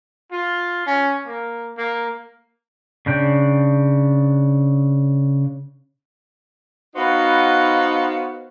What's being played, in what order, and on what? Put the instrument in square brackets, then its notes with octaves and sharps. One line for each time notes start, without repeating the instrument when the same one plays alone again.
[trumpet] F4
C#4
A#3
A#3
[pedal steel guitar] C#3 D4 G5
[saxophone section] B3 D#4 F#4 B4 C5 F5